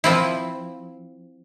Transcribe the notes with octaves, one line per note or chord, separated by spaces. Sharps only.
F3 C4 E4